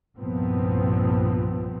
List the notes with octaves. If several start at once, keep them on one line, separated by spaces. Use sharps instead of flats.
C2 G2 A#2 F3 B3 C4